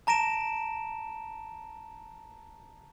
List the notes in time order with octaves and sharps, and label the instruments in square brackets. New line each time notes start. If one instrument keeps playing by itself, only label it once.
[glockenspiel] A5 A#5 A#6 D7 E7